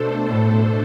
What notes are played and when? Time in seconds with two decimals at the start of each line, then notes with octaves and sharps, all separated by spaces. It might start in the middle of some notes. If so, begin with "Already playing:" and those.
Already playing: B2 A3 D4 A4 C5
0.27 A2